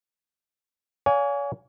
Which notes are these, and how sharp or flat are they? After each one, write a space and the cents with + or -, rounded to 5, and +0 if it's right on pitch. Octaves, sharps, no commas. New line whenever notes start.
C#5 +40 F5 +30 G#5 +0